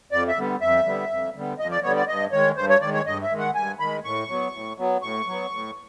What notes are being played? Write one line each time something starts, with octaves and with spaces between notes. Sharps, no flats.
F2 D5
E5
D3 G3 B3
F2 E5
D3 G3 B3
F2
D3 G3 B3
F2 D#5
D5
D3 G3 B3 C#5
D5
G2 D#5
D#3 G#3 C#5
G2 C5
C#5
D#3 G#3 D5
C#5
G2 D#5
E5
D#3 G#3
F#5
G2 G#5
D#3 G#3 B5
A2 C#6
F#3 B3
A2
F#3 B3
A2 C#6
F#3 B3
A2